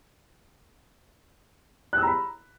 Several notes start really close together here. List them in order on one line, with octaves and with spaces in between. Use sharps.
F#6 E6 A#5 B5